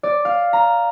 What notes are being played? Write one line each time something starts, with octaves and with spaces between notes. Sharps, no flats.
D5
F5
A#5